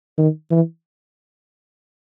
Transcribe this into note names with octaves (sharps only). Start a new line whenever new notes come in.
D#3
E3